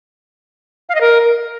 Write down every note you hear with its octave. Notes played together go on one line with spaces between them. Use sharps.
F5
D#5
A#4